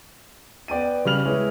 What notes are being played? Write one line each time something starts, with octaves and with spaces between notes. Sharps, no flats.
B3 D5 G5 D#7
C#3 G3 F6 F7 F#7
G#3 E4 G#4 B4 C#5